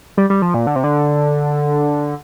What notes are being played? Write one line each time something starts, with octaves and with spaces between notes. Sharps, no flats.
G3
G3
F3
A#2
D3
C3
D3